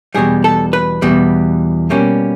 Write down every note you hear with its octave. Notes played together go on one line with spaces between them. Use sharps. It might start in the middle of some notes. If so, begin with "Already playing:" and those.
E2 B2 G3 G#4
A4
B4
E2 B2 G3
B2 G3 A#3 C#4